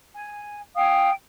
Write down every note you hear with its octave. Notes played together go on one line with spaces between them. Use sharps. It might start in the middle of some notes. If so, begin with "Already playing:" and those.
G#5
F5 G5 G#5 D#6